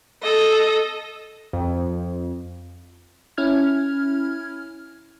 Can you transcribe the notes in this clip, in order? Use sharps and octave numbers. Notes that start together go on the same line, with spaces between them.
A4 D#5
F2
C#4 E4 F6 G#6